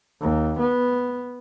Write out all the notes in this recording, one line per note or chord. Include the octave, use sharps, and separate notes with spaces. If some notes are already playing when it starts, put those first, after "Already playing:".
D#2
B3